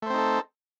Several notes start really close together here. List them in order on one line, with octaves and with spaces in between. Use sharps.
A3 C5 C4 D#4 A4